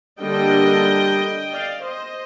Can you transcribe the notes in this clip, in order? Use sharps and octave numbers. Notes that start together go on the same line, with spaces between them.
D3 G3 A#3 D4 D#5 G5
D5 F5
C5 D#5